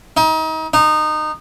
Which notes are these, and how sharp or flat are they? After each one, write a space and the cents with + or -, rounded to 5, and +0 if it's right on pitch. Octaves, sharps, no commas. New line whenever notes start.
D#4 +35
D#4 -20